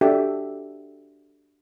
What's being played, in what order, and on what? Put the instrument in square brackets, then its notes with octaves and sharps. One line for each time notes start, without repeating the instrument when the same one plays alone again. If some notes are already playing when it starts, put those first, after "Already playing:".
[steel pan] D4 F#4 G4 A4 E5 G5